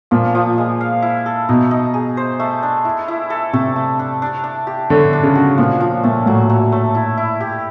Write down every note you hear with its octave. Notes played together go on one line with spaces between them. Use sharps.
A#2 F3
F3
G#3
F5
E4
A4
B2 D#4
D#4
G#4
C5
A3
D4
E4
E4
A4
C3 A3
A3
D4
D4
D4
G4
D3 C#5
D4
C#3
F#4
A#2 F3
F3
A#2 A3
A2 F#3
F#3
A3
E4
E4
G4